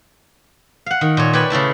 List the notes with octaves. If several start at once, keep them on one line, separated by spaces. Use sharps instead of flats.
F5 F#5
D#3
A#2 C#5
B4 C#5 D5 G5 G#5 B5
C#3 A3 E4 A5